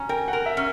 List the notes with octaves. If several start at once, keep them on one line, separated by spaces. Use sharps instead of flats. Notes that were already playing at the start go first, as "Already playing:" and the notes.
Already playing: C#4 G#5 A#5
A#4 G5
F#5
A#4
E5
C#4